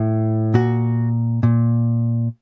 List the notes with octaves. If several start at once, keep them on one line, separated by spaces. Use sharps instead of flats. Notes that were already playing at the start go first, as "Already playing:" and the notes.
Already playing: A2
A#2 F#4
A#2